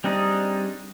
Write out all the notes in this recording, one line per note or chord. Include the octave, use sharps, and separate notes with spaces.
G3 C4 D4 D#4 G#4